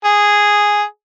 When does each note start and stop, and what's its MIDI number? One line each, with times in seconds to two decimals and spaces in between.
0.04 0.83 68